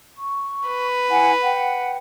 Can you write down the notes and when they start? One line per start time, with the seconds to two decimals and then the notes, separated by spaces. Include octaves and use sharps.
0.15 C#6
0.67 B4
1.09 E4 F#5 G#5
1.42 F#5 G5